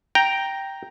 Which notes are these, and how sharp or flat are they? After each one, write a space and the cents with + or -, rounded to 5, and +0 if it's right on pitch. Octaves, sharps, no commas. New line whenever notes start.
G5 +0 A#5 +0